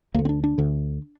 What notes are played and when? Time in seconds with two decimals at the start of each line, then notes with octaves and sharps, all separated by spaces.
0.14 D2 D3 A#3
0.25 C4
0.29 D4
0.44 D4
0.58 D2 D3